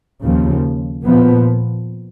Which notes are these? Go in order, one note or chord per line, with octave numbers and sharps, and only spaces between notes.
D#2 C#3 F3
A#2 F3 B3